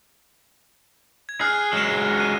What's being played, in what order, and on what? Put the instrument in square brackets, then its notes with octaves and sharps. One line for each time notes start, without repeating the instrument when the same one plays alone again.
[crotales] G#6
[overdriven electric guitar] G#4 [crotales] F6 F#6 C7
[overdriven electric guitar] F#3 G#3 [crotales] F6 E7
[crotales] F#6 D#7